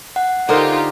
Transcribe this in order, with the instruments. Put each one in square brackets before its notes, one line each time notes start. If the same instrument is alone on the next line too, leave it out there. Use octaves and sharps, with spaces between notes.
[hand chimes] F#5
[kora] D3 A#4 C5 [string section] D#4 F4 G4